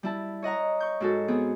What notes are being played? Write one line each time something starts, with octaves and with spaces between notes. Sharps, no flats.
G3 E4 A5
C#5 D#5 F#5 A#5
C#6 G6
G#2 F#4 A4
B3 C4 G#4